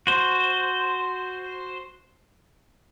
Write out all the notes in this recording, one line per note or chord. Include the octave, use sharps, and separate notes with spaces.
F#4 C5